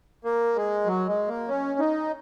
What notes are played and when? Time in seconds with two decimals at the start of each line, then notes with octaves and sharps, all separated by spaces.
0.24 A#3
0.56 G#3
0.86 F#3
1.08 G#3
1.28 A#3
1.48 C#4
1.79 D#4